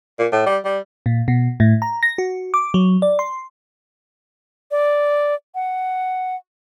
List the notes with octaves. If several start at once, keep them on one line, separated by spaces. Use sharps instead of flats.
A#2
A2
G3
G3
A#2
B2
A2
A#5
A#6
F#4
D6
F#3
D5
C6
D5
F#5